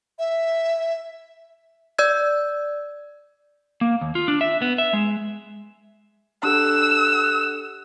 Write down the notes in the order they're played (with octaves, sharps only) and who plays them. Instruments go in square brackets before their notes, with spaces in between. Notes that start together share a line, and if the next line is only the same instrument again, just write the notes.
[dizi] E5
[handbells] D5 E6 G#6
[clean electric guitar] A#3
D#2
F4
D4
E5
B3
E5
G#3
[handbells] D4 G4 A4 [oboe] F#5 [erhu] E6